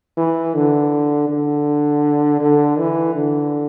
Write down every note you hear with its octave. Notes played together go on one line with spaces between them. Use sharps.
E3
D3
D3
D3
E3
D3